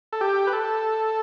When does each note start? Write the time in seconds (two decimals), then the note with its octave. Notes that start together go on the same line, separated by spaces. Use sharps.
0.13 A4
0.21 G4
0.47 B4
0.53 A4